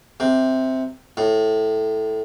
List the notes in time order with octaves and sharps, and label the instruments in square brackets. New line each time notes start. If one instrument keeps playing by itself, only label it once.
[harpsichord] C3
A2